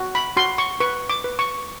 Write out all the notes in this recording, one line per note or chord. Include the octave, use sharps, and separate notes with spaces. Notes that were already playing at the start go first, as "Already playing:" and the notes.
Already playing: F#4
B5
F#4 C6
C#6
B4 C#6
D6
B4
C#6